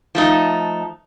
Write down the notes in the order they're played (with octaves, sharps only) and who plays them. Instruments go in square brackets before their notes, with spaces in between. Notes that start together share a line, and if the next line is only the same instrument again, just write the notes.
[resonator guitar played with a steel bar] F3 A3 D#4